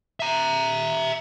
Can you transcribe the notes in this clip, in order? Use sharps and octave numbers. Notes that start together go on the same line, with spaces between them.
E5 A#5